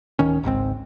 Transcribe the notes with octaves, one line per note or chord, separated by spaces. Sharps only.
D1 D#3 C#4
G#1 C#2 G#2 C4